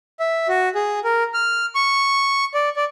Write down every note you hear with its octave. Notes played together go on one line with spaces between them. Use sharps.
E5
F#4
G#4
A#4
F6
C#6
D5
D5